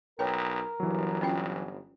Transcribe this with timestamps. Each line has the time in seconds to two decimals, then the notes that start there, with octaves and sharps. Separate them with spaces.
0.19 B1 A#4 B4 C#5 G5
0.80 G1 E3 F#3
1.22 C#4 F4 G5